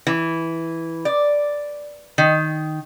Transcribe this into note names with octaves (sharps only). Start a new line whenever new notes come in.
E3
D5
D#3